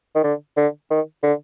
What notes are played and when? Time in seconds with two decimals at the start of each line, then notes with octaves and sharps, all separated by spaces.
0.15 D#3
0.23 D3
0.57 D3
0.91 D#3
1.23 D3